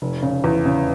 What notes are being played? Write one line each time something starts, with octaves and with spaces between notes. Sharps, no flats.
F1
C#3
E2
C#3